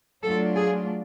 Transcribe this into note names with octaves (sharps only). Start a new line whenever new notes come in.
F#3 A3 D4 F4 A4
G#4